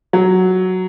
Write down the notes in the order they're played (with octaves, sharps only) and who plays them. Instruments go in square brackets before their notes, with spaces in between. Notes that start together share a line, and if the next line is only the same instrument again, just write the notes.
[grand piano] F#3